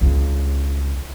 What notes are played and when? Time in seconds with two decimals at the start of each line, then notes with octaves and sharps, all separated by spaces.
0.01 C#2 D3